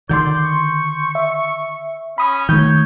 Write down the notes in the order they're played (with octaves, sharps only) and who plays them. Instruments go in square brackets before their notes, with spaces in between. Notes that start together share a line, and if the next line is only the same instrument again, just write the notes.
[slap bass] D3 D#3 [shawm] D5 [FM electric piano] C6 G6
[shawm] C#6
[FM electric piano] E5
[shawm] C#4 [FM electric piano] B5 D#6
[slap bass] D#3 A3 [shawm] C#5 [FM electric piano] G6